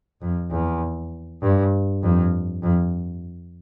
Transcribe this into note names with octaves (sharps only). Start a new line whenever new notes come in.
F2
E2
G2
F2
F2